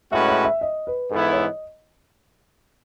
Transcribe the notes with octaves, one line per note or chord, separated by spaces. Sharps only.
A2 G#3 C#4 F#4 B4 E5
E5
E5
D#5
B4
G#2 E3 B3 E4 A4
C#5
D#5